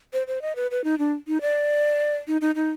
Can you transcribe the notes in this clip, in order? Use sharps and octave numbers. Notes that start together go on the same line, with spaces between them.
C5
C5
D#5
B4
B4
D#4
D4
D#4
D5
D#4
D#4
D#4